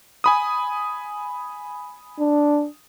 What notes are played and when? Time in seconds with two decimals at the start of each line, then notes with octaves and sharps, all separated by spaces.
0.24 G#5 B5 D#6
2.19 D4